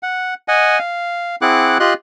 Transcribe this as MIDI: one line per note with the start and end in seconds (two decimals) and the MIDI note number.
0.03 0.34 78
0.48 0.79 75
0.48 0.79 78
0.48 0.79 80
0.79 1.36 77
1.42 1.78 60
1.42 1.78 64
1.42 1.78 68
1.42 1.78 78
1.42 1.78 86
1.42 1.78 90
1.80 1.94 65
1.80 1.94 67
1.80 1.94 75
1.80 1.94 84
1.80 1.94 90